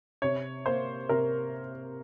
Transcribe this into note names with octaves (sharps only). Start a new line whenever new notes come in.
C3 C#5
A#3 C5
C3 A#4